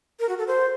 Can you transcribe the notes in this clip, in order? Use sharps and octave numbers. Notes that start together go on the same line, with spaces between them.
A#4
F#4
A4
C5